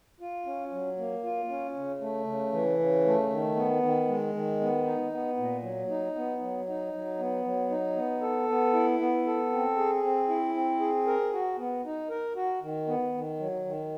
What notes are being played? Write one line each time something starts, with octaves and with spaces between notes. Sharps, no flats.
F4
C#4
F#3
A#3
F4
C#4
C#3
A3
C#3
E3
C#3
A3
D#3
B3
D#3
G#3
D#3
B3
D#4
B3
A#2
F#3
D#4
B3
F#3
D#4
F#3
B3
F#3
D#4
B3
A4
B3
E4
B3
A4
C4
G#4
C4
E4
C4
G#4
A#4
F#4
B3
D#4
A#4
F#4
D#3
B3
D#3
F#3
D#3